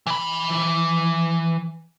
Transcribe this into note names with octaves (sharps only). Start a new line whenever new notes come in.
E3 B5